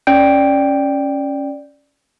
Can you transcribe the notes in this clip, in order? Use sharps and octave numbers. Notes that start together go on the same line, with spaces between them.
C#4 D5 G5 G6 D7